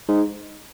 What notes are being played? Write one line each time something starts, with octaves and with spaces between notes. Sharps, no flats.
G#2